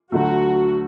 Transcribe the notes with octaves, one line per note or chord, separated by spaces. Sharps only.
D2 D3 F#3 A3 F#4